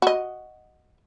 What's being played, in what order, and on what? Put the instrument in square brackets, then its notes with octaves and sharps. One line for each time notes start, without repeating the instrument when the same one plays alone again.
[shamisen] F#4 D#5